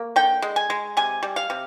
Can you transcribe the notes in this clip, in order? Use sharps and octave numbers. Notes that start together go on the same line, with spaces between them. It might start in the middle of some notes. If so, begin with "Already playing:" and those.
Already playing: A#3
D3 G5
G#3
G#5
G#3
C3 G#5
G3
F5
C3